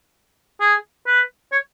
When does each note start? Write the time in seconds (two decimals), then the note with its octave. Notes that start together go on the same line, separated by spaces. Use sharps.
0.60 G#4
1.07 B4
1.52 C#5